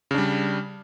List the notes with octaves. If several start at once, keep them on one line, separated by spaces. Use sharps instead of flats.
C#3 G3 D4